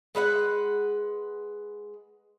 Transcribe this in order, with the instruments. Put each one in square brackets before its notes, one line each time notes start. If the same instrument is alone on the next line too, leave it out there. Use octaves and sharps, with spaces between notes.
[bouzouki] G#3 B4 E5 F#5